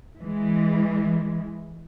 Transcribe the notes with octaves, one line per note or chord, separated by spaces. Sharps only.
E3 G#3